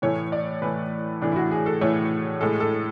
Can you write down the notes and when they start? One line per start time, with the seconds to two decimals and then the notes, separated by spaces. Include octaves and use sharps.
0.02 A2 E3 A3 C#5
0.32 D5
0.62 A2 E3 A3 B4
1.21 A2 E3 A3 D4
1.32 E4
1.36 F#4
1.52 G#4
1.66 A4
1.81 A2 E3 A3 C#5
2.41 A2 G#3 A4
2.60 A4